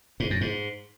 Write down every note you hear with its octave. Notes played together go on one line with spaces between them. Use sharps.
G#2
F#2
G#2